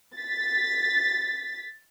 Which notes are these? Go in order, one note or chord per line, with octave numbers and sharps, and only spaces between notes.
A6 B6